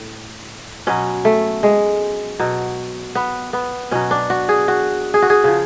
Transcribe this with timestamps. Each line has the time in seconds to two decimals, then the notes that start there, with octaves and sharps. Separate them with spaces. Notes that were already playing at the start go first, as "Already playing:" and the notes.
Already playing: A2
0.87 B2 F#3 C#4
1.25 A3
1.63 G#3
2.39 B2 F#3
3.15 B3
3.53 B3
3.91 B2 F#3 C#4
4.11 D4
4.30 F#4
4.49 G#4
4.68 F#4
5.14 G#4
5.22 F#4
5.30 G#4
5.44 C#3 F3